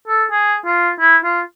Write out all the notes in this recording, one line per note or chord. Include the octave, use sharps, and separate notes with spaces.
A4
G#4
F4
E4
F4